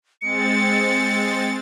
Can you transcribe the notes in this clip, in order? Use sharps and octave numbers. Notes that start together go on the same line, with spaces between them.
G#3 C4 A6 C#7